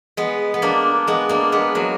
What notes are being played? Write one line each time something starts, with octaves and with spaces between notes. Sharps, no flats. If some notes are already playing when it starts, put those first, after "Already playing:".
G#3 B3
B3
A#3 D4
G#3 B3
A#3 D4
G#3 B3
F#3 A#3